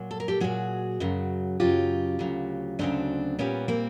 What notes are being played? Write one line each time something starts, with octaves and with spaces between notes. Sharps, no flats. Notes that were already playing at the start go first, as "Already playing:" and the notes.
Already playing: A#2 F#3
A4
A#4
G4 A4
A#2 F#3 F#4 G#4
F#2 C#3 F#3
F#2 C#3 F#3 F4 G4
D2 C#3 F#3
D2 C#3 F#3 C4 D4
A#2 G3 B3 C#4
A#3 C4